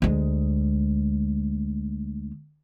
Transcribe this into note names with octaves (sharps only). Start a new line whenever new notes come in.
D2 G#3